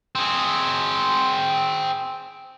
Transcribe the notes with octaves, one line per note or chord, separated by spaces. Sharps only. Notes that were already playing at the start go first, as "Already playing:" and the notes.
C4 G#4